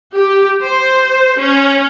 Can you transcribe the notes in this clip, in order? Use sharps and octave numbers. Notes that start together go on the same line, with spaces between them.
G4
C5
C#4